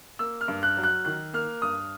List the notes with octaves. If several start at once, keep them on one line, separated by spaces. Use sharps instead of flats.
A#3 E6
F6
G2
F#6
F#3
F#6
D#3 F#6
A#3 F6
G2 D#6